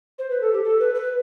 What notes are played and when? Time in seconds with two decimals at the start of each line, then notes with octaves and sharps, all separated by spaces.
0.19 C5
0.30 B4
0.41 A4
0.53 G4
0.64 A4
0.79 B4
0.95 B4